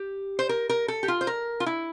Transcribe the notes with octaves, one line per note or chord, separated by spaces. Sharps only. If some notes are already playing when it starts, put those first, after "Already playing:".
Already playing: G4
C5
A#4
A#4
A4
G4
F4
C5
A#4
F4
E4